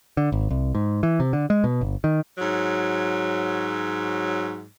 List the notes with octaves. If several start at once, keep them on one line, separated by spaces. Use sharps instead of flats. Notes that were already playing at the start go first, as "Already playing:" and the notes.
D3
G#1
C2
G#2
E3
C3
D3
G#3
B2
G1
D#3
G#2 F#3